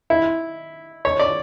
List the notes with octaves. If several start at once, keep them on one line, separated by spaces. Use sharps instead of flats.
E4
C#5
D5